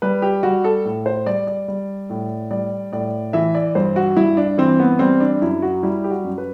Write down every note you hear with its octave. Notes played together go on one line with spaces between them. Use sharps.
G3 B4
G4
G3 F#4
A4
A2
C5
G3 D5
D5
G3
A2
G3 D5
A2 D5
E3 E5
D5
G2 C5
F#4
G2 E4
D4
E3 C4
B3
G3 C4
D4
F#2 E4
F#4
G3 E4
G4
F#4
F#2
B4